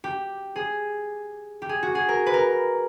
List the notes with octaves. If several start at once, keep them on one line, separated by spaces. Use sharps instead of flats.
G4
G#4
G4
G#4
F#4
G#4
A#4
B4
A#4